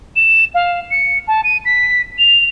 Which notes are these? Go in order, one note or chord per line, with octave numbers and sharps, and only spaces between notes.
E7
F5
C#7
A5
D#7
B6
F7